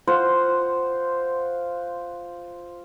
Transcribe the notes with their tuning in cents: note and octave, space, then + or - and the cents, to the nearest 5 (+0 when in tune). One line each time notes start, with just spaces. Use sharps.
F4 +0 C5 -5 F#5 +0